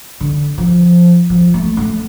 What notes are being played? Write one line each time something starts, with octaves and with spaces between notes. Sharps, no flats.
D3
F3
F3
A3
A3